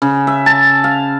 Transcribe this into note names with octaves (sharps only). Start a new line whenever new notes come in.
C#3
E5
A5
F5